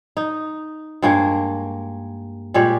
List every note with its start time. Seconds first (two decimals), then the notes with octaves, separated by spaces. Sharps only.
0.17 D#4
1.02 G2 G#3 A#3 C#5
2.54 A#2 G3 G#3 C#5